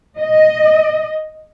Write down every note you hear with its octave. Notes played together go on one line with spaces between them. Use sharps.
D#5